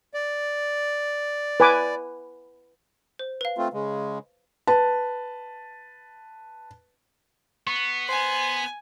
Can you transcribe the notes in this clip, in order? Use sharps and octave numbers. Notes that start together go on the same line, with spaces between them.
D5
B4 G#5 D6
C5
B4 F5
A3 C4 F4
C#3 G#3
B4 A5
B3 C#6
C5 G#5